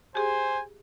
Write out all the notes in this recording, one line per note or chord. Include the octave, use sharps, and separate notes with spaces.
G4 G#4 C5 G#5